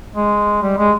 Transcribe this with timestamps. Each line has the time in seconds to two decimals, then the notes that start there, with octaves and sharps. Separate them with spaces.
0.15 G#3
0.62 G3
0.78 G#3